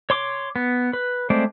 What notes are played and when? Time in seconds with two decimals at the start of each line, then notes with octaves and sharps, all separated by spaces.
0.10 C#5 C6 D6
0.56 B3
0.93 B4
1.30 G#3 A3 C4 C5 D5